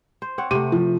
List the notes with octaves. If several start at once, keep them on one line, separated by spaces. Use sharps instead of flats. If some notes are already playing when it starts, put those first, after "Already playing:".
C5
C4 C#5 F#5
C3 A3 D#7
F3